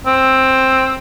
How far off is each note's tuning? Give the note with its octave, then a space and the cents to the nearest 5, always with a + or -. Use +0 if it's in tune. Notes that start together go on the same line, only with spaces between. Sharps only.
C4 +10